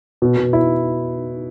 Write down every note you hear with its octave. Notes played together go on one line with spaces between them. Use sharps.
B2
B2
E4